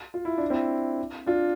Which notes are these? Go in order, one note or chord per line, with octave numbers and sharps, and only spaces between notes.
F4
E4
D4
C4 E4
D4 F4